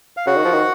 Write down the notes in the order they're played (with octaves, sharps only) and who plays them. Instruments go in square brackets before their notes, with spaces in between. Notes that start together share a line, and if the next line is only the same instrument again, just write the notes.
[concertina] F5
[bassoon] C#3 [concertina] F#4 F#5
[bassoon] D#3
F3
D#3